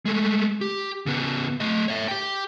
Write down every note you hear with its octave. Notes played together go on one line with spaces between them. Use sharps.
G#3 A3
G4
C#3 B3
A3 D#5
C#5 E5
G4 G5